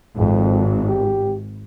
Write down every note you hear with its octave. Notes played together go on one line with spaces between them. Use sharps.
G#1 F2
G4